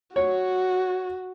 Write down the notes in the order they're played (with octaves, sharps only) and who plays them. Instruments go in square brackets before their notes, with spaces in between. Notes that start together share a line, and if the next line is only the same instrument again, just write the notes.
[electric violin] F#4 [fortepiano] C#5